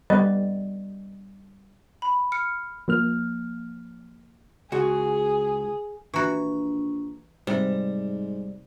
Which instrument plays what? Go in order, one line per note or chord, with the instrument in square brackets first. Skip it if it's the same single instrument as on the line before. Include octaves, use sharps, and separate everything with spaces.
[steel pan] G3 B3 [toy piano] D#5
[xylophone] B5
F6 C#7
[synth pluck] F3 A#3 F6
[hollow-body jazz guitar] C#2 F#4 [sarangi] G#4
[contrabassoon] A#1 [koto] E3 F#4 [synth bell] A#5 C#6
[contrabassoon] G#2 [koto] C3 [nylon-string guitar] G3 [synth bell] C5